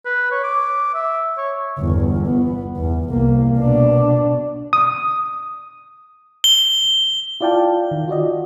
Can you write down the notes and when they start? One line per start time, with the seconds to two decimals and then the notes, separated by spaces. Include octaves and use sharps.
0.05 B4
0.31 C#5
0.44 D6
0.94 E5
1.37 C#5
1.79 G1 E2
2.27 B3
2.77 E2
3.10 C2 A#3
3.57 B2 D4
4.73 D#6
6.44 G7
7.41 E4 F4 D5 F5 G5 A5
7.91 D#3
8.08 F4 F#4 D5 D#5